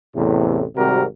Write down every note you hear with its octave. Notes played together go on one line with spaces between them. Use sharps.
A1 E2 A2 C3
G#1 C3 G3 F#4 A#4